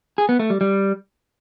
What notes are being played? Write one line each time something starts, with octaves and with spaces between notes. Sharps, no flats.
G#4
B3
A3
G3
G3